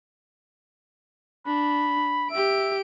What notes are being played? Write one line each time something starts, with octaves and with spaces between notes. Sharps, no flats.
D4 B5
G4 E5 D7